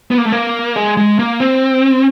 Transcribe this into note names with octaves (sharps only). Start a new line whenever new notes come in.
B3
A#3
A3
A#3
G#3
G#3
A#3
C4